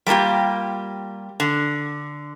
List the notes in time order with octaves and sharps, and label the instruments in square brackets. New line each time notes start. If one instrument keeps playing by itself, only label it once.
[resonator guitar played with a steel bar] G3 A3 A#3 F4 G4
D3